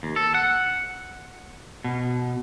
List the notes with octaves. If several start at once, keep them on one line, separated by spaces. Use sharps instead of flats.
D#2
A4
F#5
B2